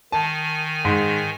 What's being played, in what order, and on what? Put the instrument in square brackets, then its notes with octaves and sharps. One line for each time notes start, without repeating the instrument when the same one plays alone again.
[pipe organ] D#3 G#5 [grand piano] A5
[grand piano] G#2